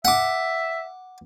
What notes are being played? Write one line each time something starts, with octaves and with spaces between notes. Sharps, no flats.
E5 F#5 D6